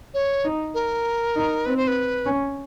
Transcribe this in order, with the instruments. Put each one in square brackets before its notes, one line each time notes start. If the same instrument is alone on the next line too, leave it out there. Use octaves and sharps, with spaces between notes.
[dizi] C#5
[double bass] D#4
[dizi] A#4
[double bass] D#4
[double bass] C4 [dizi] B4
[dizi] C5
B4
[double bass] C#4